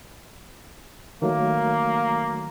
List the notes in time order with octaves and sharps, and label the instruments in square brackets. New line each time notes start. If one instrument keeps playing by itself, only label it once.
[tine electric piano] D#3 F#3 A3 [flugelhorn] A#3